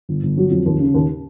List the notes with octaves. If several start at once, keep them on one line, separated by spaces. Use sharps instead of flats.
G1
G1
F#3
F2
D#2
C#3
D#2